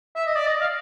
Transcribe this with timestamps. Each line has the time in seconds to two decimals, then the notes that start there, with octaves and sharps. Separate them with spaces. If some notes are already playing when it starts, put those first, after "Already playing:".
0.16 E5
0.26 D#5
0.36 D5
0.47 D#5
0.61 F5